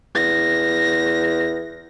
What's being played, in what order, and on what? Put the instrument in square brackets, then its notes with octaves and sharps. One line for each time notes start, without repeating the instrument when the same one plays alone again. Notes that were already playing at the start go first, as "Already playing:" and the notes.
[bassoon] E2 [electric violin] A#6